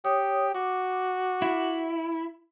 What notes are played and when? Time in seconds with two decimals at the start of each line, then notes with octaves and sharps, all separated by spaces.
0.05 G4 C#5 D#6
0.55 F#4 D6
1.42 E4